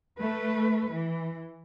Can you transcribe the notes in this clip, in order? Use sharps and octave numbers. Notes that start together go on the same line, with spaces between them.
A3 B4
E3